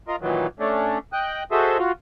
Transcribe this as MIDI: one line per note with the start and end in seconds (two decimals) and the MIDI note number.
0.08 0.16 65
0.08 0.16 70
0.08 0.16 75
0.21 0.47 46
0.21 0.47 51
0.21 0.47 52
0.21 0.47 54
0.60 0.98 57
0.60 0.98 61
0.60 0.98 62
1.13 1.43 75
1.13 1.43 79
1.13 1.43 90
1.51 1.78 66
1.51 1.78 68
1.51 1.78 69
1.51 1.78 72
1.51 1.78 75
1.51 1.78 76
1.78 1.92 65
1.78 1.92 66